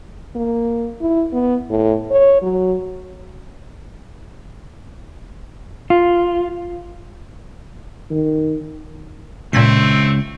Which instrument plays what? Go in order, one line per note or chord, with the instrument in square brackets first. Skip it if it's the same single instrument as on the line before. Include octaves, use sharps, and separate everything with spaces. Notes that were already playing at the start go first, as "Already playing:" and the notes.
[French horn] A#3
E4
B3
A2
C#5
F#3
[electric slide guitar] F4
[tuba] D#3
[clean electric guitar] C#2 [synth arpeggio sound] A#2 G#6 B6 [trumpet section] A3 C4